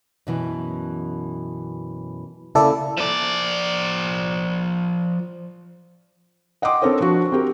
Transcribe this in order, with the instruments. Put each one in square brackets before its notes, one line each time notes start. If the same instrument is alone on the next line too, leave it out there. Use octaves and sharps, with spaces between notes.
[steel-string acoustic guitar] F#2 B2 E3
[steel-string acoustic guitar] C#3 A#3 [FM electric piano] E4 A4 D5
[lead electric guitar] F3 D5
[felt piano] D#5 F#5 G5 C6 D6 D#6
C4 D4 A4 A#4 C5 C#5
F3 D4 F#4
C4 F#4 G4 A#4